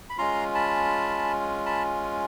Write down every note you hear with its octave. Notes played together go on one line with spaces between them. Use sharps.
B5
G#3 C#4 F4 A#5 C6
A5 B5
A5 B5